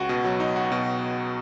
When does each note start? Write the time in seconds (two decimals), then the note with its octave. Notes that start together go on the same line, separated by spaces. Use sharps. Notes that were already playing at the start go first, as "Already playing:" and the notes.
Already playing: C#2 F#4
0.09 B2
0.25 F#3
0.40 D#4
0.56 F#4
0.72 B2